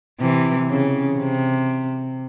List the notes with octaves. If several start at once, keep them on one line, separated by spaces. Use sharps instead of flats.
C3 E3
C#3
C3